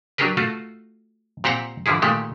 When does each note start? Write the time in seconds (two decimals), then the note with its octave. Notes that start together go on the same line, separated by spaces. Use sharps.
0.18 F#3 D4 G4 G#4 A#4 B4
0.37 A3 F4 F#4
1.44 A#2 C4 G4 C5 F#5 A#5
1.86 D3 E3 F3 E4 G#4
2.02 A#2 D#3 G#3 A3 G4